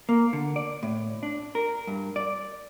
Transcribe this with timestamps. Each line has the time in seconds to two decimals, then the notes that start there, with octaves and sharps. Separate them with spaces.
0.09 A#3
0.33 D3
0.56 D5
0.83 A2
1.23 D4
1.55 A#4
1.87 G2
2.16 D5